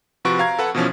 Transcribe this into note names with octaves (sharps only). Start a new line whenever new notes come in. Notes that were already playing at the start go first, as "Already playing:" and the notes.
C3 F3 F#4 B4 C#6 D7
F5 A#5 G#6
A4 B4 F#5
B2 E3 F3 C#4